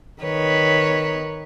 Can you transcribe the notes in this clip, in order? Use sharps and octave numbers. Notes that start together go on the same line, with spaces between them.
D#3 B4 C#5